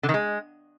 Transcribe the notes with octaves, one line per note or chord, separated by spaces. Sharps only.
D3
D#3
G#3